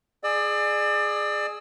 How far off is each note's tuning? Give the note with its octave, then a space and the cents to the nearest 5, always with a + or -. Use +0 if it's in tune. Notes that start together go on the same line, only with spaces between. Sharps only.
G#4 +0 D5 +30 E6 -25